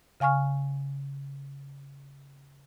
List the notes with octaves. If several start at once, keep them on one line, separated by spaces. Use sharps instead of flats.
C#3 F5 G#5 C#6 F6